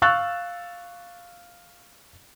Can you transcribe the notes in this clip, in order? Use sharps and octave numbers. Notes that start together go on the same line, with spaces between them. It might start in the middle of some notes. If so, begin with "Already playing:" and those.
F5 C#6 E6 F#6 A6